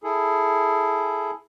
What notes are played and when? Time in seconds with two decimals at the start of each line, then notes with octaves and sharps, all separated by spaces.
0.04 E4 G#4 A4